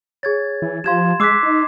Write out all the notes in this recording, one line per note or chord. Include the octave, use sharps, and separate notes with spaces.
G#4 C#5 G#6 A6
E3
F3 G4 F5 C6 G#6 E7
G#3 D6 E6 F#6 B6 C7
D#4